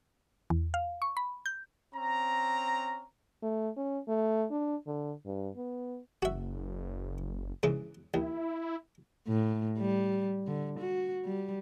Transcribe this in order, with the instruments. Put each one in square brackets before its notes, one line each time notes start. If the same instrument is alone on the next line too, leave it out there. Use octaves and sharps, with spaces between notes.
[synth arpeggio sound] E2
F5
C#6
B5
G6
[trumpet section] C4 C#4 A#5
[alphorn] A3
C#4
A3
D4
D3
G2
B3
[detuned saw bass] F#1 [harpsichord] F#4 E5
[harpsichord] G#2 C#3 E3
[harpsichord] D#2 [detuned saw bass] E4
[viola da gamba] A2
G3
D3
F#4
G3